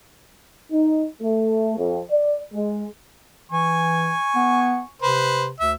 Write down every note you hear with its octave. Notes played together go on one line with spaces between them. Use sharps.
D#4
A3
F2
D5
G#3
E3 G#5 C#6
B3
C3 B4 C5
D2 E5